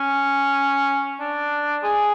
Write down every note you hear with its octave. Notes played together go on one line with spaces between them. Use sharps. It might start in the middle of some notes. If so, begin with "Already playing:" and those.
Already playing: C#4
D4
G#4